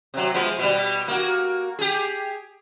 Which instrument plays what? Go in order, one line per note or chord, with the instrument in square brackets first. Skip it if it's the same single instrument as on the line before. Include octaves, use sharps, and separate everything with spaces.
[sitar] C3 F#3
F3 G#3 B3
B2 G3
A#3 F#4
G4 G#4